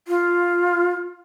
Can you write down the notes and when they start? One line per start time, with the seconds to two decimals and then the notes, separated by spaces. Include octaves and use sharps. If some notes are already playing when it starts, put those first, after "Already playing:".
0.08 F4